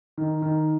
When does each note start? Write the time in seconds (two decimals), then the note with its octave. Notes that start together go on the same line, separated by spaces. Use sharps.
0.17 D#3
0.42 D#3